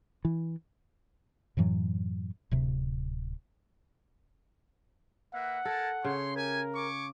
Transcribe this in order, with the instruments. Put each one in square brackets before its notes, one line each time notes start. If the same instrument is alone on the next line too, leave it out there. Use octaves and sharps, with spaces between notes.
[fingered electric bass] E3
[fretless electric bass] F#2 A2 E3 F#3
D1 C3
[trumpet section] A#3 B4 E5 [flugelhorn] F#5
[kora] A4 [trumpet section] A#4 G#5 A5
[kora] C#3 [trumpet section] C#5 C6
[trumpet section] G4 G#5 [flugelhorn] A#4
[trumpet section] G#5 C#6 D6